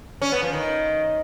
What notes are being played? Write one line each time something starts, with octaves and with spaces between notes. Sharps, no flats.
C#4
B3
F3
D#3